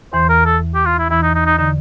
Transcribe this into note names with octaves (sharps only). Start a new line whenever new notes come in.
E2 E3 C5
A#4
A4
G4
F4
E4
E2 E3 E4
D#4
D#4
D#4
D3 D#4